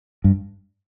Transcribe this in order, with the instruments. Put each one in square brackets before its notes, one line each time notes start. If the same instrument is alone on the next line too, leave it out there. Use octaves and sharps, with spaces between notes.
[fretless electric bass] G2